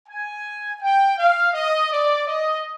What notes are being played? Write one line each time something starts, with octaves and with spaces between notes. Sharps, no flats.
G#5
G5
F5
D#5
D5
D#5